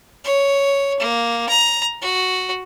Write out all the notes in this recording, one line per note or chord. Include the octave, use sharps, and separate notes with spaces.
C#5
A#3
A#5
F#4